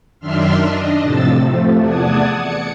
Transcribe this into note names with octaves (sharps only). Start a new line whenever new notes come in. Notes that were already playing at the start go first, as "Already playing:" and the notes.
F#2 D#3 D4 E5 C6 F6
D4 D#5
F2 A2 C3 F3 E6 A6
C3 F3 A3
E2 D5 F#5 A5 D#6 G#6
C#7